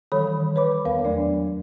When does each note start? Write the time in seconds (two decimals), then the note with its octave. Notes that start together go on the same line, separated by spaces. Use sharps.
0.12 D#3 E3 G3 A4 C#5 B5
0.56 B4 C#5 B5 D6
0.85 E2 B3 A#4 F5
1.04 F2 F#3 A3 D4 D5